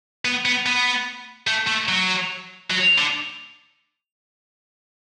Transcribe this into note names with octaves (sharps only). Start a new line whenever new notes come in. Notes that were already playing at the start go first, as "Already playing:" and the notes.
B3
B3
B3
A3
A3
F#3
F#3
D3